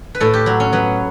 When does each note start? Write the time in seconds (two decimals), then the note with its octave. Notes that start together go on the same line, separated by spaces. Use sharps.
0.15 B4
0.20 A2 A4
0.34 G4
0.46 F#3 F#4
0.60 C#4
0.73 F#3 B3